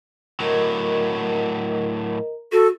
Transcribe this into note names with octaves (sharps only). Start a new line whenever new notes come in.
A2 F#3 A#4 D#5 A#5
F#4 A4